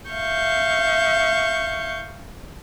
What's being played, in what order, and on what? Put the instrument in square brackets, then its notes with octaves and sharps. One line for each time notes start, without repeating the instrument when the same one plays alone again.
[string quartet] E5 F5 C#6 G6